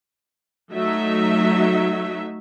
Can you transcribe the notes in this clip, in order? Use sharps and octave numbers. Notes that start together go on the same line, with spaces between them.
F#3 A3 D#4 E5